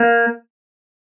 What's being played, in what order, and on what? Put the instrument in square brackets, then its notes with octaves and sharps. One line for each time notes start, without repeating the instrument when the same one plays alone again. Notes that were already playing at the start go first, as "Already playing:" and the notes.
Already playing: [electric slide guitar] A#3